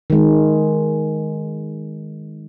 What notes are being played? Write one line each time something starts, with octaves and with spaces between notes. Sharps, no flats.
D#3 G#3